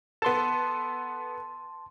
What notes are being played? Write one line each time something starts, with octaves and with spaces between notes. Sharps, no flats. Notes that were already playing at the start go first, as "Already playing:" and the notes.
B3 A4 A5 C6